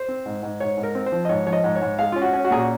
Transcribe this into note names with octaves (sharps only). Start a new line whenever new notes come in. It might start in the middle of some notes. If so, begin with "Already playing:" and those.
Already playing: C5
C4
G#2
G#2
G#2 C#5
G#2
A#4
C4
C5
F3
D#5
G#2 C#5
F3 C#5
D#5
G#2
C#5
G#2
G#3 F5
C#4 F4
F#4
C#4
F#4
A#2 G#4
F#4